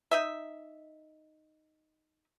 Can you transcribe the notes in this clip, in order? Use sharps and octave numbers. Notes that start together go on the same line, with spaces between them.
D#4 D#5 E5